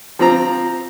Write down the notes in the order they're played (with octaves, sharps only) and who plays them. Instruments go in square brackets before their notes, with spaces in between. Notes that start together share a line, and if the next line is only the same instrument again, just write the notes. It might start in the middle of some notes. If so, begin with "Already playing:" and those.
[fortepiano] F3 C4 A#5